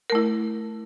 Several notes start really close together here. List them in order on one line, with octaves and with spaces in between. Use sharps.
A#4 A3 E4